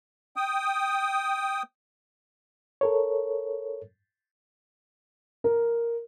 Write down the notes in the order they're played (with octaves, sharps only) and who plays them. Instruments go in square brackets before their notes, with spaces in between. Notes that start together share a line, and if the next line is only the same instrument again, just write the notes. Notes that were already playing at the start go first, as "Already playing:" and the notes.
[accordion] G5 D#6
[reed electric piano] A4 A#4 C#5
[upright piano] A#4